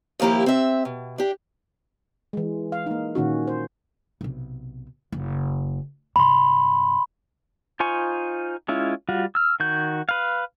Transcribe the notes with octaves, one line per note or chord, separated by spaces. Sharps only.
D#2 F3 A#3 E4 G4
C4 E5
B2
D4 G4
E3 G#3
F5
A#3 D#4
A#2 D#3 C#4 F#4
C5
B1 C3
F#1
G2 C3 B5 C6
D#4 F4 C5 G#5 C#6
G#3 C#4 E4 F4
G3 F4 F#4
E6 F6
D#3 F#4 G6
B4 F5